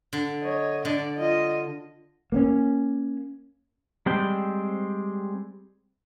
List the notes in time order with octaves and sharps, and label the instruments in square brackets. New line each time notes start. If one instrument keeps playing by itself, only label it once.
[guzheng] D3
[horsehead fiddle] C#5 D#5
[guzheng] D3 [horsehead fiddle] D5
[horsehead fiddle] F4 D#5
[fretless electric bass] A#3 B3 C#4
[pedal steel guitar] G3 G#3 C4 G5